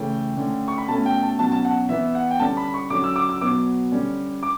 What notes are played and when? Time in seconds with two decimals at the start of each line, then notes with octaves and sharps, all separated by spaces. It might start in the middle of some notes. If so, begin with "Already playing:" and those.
Already playing: C#3 E3 A3 C#4 G5
0.37 D3 A3 C#4
0.68 C#6
0.78 B5
0.88 B2 A3 C#4 A5
1.06 G5
1.23 A5
1.39 B2 F#3 C#4 A5
1.52 A5
1.65 F#5
1.89 E3 B3 E5
2.15 F#5
2.31 G5
2.40 D3 G3 C#4 A5
2.57 B5
2.74 C#6
2.90 D3 F#3 C#4 D6
3.04 E6
3.16 D6
3.29 E6
3.41 B2 F#3 B3 D6
3.92 D3 G3 C#4
4.43 D6